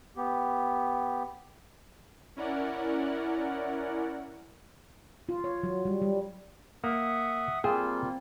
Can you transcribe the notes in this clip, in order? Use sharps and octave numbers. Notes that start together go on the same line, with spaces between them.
B3 G4
C#4 E4 A#4 D5 F#5
F4
C#5
F#3
G3
G3
A#3 E5 F#5 D#6
G3 A#3 C4 F4 G#4